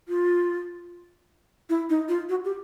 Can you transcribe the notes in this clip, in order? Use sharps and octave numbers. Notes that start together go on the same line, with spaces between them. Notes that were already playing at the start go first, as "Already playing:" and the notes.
F4
E4
D#4
F4
F#4
G4